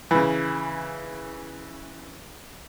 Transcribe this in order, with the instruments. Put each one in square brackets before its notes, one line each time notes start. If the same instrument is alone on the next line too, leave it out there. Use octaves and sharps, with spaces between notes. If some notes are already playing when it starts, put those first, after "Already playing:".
[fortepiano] C#3 E3